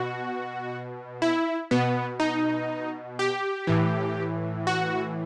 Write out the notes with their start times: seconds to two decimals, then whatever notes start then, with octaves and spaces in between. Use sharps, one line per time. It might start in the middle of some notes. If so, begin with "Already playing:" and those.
Already playing: B2 F#4
1.22 E4
1.71 B2 B3
2.20 D#4
3.19 G4
3.67 A2 E3
4.67 F#4